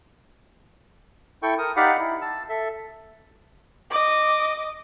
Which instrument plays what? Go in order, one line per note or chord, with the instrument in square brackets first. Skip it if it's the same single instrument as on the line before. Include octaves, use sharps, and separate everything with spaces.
[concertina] E4 A4 G5 C#6
A#4 D#6
D#4 G4 D5 F5 F#5 B5
E4
A5 E6
A4 E5
[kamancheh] D#5 D6